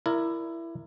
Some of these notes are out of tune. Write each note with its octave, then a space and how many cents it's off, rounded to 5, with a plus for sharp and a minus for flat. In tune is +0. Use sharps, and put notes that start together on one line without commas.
E4 +15 A#4 +0 D5 +10